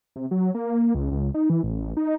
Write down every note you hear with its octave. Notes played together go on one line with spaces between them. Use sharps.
C3
F#3
A#3
C#2
C#2
D#4
E3
A1
D#4